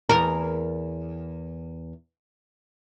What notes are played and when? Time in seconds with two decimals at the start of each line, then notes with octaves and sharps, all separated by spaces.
0.09 E2 A#4